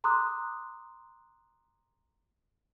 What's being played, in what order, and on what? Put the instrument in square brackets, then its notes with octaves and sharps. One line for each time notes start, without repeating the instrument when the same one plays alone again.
[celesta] A#5 C6 D6 D#6 F#6